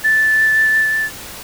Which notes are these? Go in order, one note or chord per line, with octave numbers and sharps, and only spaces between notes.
A6